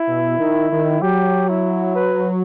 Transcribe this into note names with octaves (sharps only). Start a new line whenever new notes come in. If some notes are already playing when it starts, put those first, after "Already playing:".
Already playing: E4
B2
D#3
D#3
F#3 G4
E4
B4